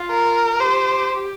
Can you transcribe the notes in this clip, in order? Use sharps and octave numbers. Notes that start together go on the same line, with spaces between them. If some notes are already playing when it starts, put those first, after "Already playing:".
Already playing: F4
A#4
G4 C5